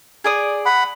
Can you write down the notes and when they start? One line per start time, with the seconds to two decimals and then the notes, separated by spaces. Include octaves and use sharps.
0.24 G#4 D5 D#6
0.66 F#5 B5